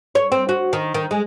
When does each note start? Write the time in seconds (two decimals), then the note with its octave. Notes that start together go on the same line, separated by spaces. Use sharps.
0.15 C#5
0.32 C4
0.49 F#4
0.73 D#3
0.94 D#3
1.11 G#3